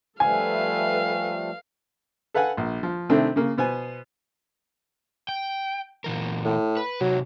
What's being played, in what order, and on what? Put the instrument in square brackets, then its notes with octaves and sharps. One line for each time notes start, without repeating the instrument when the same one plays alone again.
[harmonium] F3 G3 A3 [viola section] A4 B4 E5 [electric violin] F5 [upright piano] G#5
[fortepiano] A4 B4 F5 F#5 G#5
A#1
F3
C3 D#3 A3 C4 D4 E4
C#3 A#3
B2 B3 C5 G#5
[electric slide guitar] G5
A#2 E3 A#4
[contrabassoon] A2
[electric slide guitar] B4
[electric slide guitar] C3 D#4 [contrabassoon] F#3